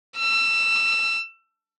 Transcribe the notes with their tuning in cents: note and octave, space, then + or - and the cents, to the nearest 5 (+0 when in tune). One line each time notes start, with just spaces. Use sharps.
E6 +25